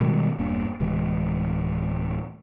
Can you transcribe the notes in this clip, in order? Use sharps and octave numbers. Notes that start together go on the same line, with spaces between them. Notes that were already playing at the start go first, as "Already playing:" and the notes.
B2 D#3 G3 G#3
E1 G2 A#3 D4
D1 C3 E3 G#3